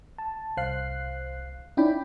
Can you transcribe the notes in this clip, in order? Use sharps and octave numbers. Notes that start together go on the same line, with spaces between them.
A5
C2 C5 F5 F#6 C7
C#4 D#4 E4 D5 G5 B5